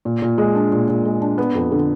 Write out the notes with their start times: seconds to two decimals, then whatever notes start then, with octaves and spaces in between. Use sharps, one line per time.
0.05 A#2
0.22 A#2
0.38 G#3
0.55 D4
0.72 A#2
0.89 A#2
1.05 G#3
1.22 D4
1.38 B3
1.55 F2
1.72 D3